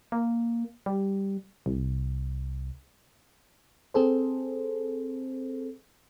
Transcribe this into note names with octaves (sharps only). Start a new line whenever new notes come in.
A#3
G3
C2
C4 G#4 A4 C5